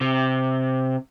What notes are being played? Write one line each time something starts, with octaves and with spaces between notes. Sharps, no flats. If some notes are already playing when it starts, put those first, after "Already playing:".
C3